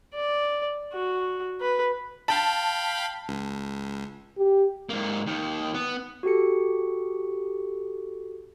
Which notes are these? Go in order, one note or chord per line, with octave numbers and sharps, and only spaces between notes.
D5
F#4
B4
F5 G5 A5 B5
C#2
G4
G#2 A#3
D#2 D#3
B3
F#4 G4 A4 C#7